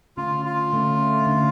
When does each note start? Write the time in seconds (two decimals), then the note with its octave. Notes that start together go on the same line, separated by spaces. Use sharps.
0.17 D3 A3 C#4 F4
0.45 F4
0.73 D3 A3 C#4
1.26 D3 A3 C#4